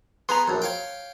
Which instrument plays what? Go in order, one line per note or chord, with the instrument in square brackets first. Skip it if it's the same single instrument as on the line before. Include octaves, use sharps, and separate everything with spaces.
[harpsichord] B3 G#4 [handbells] A#5 C6
[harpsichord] A#1 F#2
C#5 F5 G5